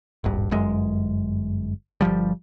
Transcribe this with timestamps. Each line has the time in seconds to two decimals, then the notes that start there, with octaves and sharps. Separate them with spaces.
0.24 D#1 G#1 G2
0.51 G1 F#2 G#3
2.01 G1 C#2 F3 G3